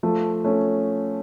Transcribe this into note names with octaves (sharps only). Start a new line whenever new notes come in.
F3 A3
A3 C#4